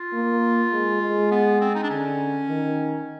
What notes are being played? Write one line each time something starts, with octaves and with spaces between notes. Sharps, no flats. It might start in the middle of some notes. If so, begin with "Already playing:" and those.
Already playing: F4
A#3
G#3
G#3
B3
C4
D#4
D4
D3 C#4
D#3